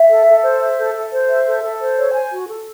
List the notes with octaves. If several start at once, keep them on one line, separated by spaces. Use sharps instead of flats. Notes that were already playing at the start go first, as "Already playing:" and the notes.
Already playing: E5
A4
A4
C5
E5
A4
A4
C5
E5
A4
A4
C5
C#5
G#5
F#4
A4